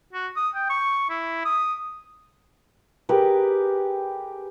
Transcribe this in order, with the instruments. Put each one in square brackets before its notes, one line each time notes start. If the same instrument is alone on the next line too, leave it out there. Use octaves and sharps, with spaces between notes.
[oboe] F#4
D#6
G5
C#6
E4
D#6
[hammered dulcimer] G4 G#4 A#4 B4